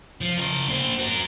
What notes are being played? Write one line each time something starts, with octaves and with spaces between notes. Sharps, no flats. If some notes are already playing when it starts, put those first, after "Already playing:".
F3
C#3 A#4
A#3 C5
F#4 A#4